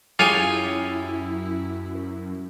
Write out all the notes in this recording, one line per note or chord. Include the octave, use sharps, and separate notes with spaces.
F#2 E4 F4 G4 G#4 C#5 G5 G#5